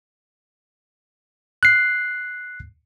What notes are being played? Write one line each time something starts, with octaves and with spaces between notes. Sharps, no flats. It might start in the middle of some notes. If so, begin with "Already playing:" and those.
F#6 C7